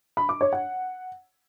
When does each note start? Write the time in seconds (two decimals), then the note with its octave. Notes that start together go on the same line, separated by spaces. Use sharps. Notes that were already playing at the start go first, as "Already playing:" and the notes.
0.17 B5
0.29 D6
0.41 C#5
0.53 F#5